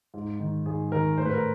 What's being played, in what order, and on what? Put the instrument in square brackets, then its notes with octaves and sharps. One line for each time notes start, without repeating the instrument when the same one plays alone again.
[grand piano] G#2
D#3
G#2 G#4
D#3 A#4
A2 C5
B4
A#4